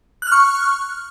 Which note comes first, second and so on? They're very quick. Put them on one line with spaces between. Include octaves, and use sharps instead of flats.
F#6 F6 C#6